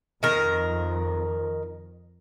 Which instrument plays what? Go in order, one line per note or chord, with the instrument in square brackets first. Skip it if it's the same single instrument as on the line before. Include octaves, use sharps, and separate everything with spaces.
[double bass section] F2 [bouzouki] D#3 A#4